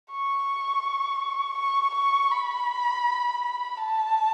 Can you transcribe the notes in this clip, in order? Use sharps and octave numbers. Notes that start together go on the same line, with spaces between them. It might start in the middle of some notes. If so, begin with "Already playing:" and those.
C#6
C#6
C#6
B5
A5